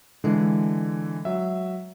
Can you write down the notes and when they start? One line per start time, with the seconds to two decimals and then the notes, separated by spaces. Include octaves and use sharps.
0.24 D3 E3 G#3
1.25 F#3 E5